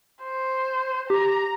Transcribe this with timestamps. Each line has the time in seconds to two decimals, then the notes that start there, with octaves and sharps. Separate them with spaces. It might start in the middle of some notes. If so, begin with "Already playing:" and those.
0.23 C5
1.10 G4 A#5